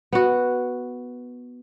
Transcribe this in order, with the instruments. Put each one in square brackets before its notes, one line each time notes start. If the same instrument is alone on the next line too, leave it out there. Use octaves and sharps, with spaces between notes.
[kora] B3 F#4